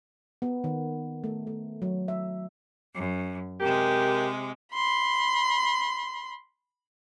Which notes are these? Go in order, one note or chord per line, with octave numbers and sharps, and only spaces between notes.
B3
D#3
A3
A3
F#3
E5
F#2
C3 G#3 G4 A#4
B5 C6